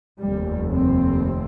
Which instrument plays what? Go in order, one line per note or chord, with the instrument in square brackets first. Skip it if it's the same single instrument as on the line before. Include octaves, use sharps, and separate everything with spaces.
[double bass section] F1 D#2 G3
C4